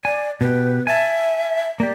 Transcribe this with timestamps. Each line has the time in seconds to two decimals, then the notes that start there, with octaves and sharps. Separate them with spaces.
0.05 D5 G#5
0.41 B2 G4 B4
0.87 E5 G#5 A5
1.80 A#3 G4 D5